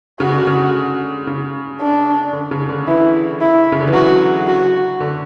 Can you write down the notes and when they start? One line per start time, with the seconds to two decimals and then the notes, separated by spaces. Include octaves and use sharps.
0.20 C#3 F#4
0.33 D3
0.47 C#3
1.27 C#3
1.81 D4
2.33 D3
2.51 C#3
2.69 D3
2.88 E3 E4
3.41 E4
3.72 C#3
3.80 D3
3.87 E3
3.93 F#3 F#4
4.48 F#4
5.00 D3